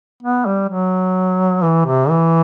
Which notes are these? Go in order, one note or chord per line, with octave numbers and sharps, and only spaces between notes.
B3
G3
F#3
E3
C3
E3